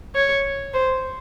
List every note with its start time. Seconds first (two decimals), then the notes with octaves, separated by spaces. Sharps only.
0.15 C#5
0.73 C5